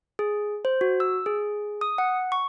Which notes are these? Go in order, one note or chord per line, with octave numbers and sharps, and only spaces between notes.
G#4
C5
F#4
E6
G#4
D#6
F#5
C#6